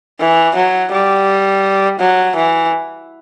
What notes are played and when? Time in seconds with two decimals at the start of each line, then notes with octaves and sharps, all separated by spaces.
0.20 E3
0.55 F#3
0.92 G3
2.00 F#3
2.36 E3